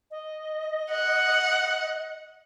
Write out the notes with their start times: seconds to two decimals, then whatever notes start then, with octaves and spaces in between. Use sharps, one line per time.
0.11 D#5
0.91 F#5